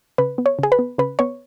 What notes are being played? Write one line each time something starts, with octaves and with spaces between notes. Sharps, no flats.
C#3 B4
B3
C#5
C#3 G#4
B4
B3
C#3 B4
B3 C#5